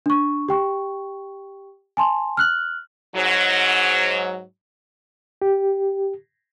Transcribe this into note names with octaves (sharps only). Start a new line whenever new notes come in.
D4 C#6
G4 G5 C#6
G#5 A5 C6
F6 F#6 F#7
G#2 F#3
G4